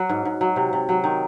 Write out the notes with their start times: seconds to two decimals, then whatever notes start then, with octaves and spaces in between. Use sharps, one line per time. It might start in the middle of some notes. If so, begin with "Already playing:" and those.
Already playing: F#3 F#4
0.09 G#2
0.25 G#2
0.41 F#3
0.56 C3
0.73 C3
0.89 F#3
1.04 D#3